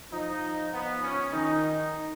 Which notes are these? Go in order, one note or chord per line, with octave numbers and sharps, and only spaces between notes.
F3 D#4
B3
C#4
D#3 D#4